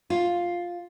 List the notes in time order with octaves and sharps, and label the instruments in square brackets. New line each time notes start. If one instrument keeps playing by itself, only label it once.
[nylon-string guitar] F4